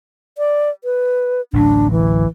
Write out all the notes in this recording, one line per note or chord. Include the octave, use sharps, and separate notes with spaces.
D5
B4
D1 A1 F#3 D4
E3